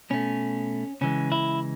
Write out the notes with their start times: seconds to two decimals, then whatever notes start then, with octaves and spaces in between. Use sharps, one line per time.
0.10 B2 A3 C#4
1.01 C#3 E3 G#3 C#4
1.32 E4